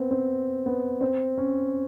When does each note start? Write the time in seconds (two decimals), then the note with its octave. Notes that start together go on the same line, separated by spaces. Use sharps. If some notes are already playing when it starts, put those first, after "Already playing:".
Already playing: B3 C4
0.11 C4
0.66 B3
1.01 C4
1.38 C#4